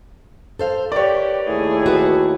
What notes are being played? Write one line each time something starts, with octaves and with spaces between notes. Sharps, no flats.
A4 C5 F5
G4 A#4 B4 C#5 D5
D#2 A3 E4 G#4
F#4 B4